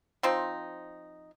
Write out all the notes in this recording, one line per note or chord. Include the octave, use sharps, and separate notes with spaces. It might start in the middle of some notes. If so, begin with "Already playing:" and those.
F3 C4 D#4